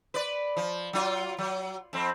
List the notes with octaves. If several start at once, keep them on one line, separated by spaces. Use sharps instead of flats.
B4 D5
F3
F#3 F4
F#3
F2 C4